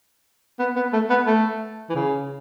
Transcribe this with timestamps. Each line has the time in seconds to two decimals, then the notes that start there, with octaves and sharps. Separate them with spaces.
0.59 B3
0.76 B3
0.93 A3
1.10 B3
1.27 A3
1.90 E3
1.95 C#3